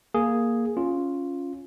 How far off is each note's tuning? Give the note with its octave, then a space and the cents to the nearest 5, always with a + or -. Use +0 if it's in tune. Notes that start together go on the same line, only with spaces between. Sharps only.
A#3 +0 G#4 +0
C#4 +0 F4 +0